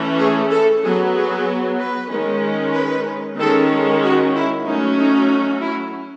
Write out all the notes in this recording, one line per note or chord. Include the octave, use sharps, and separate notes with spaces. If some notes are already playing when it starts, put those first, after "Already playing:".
Already playing: E3 A3 C#4
G#4
A4
F#3 B3 G#4
G#4
B4
D#3 G#3 C#4
B4
D#3 G#3 C#4 A4
F#4
E4
F#3 A3 C#4 D#4
D#4
E4